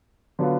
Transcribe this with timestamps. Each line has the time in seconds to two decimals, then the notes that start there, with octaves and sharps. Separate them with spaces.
0.39 D3 F#3 B3 F4